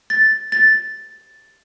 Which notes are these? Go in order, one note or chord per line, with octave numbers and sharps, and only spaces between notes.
A6
A6